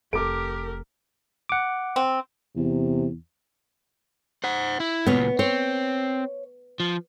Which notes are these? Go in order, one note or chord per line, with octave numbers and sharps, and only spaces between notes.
F1 G4 A4 A#4 D6 D7
F#5 D6
C4
E2 C3
C5 F#5
E4
C#2 A#2 B3 C#5
C4 C#5
F3